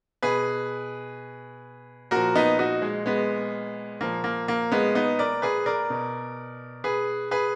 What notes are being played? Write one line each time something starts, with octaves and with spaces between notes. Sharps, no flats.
B2 G#4 B4
A#2 F3 F#4 A#4
B3 D#4
D#4 F#4
G#3
G#3 B3
A#2 F3 A#3
A#3
A#3
G#3 B3
B3 D#4
A#4 D5
G#4 B4
A#4 D5
B2
G#4 B4
G#4 B4